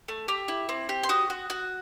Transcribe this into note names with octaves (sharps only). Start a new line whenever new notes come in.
A3
G4 E6
E4
C4
G4
C6
F#4 D#6
F#4
F#4